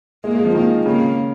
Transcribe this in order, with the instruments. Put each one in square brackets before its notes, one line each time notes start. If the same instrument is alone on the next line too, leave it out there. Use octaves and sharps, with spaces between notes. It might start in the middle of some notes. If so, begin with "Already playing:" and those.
[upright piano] G#3 [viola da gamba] A#3
[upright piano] G#3
F3
[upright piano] D#3 [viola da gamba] A#3
[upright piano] C#3 [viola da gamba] A#3